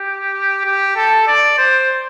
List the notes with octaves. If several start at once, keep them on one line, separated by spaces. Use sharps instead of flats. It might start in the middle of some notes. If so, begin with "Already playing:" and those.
Already playing: G4
G4
A4
D5
C5